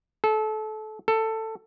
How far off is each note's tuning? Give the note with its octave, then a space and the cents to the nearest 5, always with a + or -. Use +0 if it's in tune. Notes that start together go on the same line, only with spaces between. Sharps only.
A4 -25
A4 +15